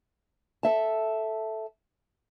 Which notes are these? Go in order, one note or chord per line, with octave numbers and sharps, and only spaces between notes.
A4 E5 A5